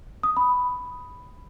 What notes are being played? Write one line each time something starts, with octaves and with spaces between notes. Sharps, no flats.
D#6
B5